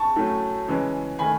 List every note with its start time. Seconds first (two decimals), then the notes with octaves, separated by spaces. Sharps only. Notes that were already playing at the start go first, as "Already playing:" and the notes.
Already playing: A5 C#6
0.16 A2 F#3 A3 C#4
0.67 C#3 E3 G#3 C#4
1.19 D#3 A3 G#5 B5